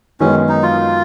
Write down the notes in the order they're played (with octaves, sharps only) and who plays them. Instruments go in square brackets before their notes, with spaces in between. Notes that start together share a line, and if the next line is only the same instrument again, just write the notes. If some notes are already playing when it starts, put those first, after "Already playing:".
[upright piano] F#2 D#3 G#3 B3 [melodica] C#4
[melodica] D#4
F4